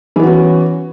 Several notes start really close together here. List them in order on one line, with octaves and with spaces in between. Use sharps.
E3 B3 F#4 C#4